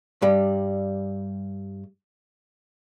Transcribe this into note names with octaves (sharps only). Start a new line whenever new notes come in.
G2 G3